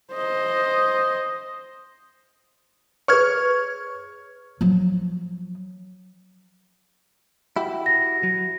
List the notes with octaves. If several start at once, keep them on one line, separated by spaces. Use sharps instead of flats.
C5 D#5
G#4 B4 C#5 C#6 F6 G#6
F3 F#3
E4 F#4 G4
A#6
F#3